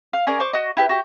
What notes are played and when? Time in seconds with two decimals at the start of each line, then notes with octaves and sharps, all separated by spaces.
0.13 F5
0.27 C#4 G#4 A#4 D5
0.40 C5 C#6 D6
0.53 F#4 D#5
0.77 E4 G4 B4
0.89 F#4 G4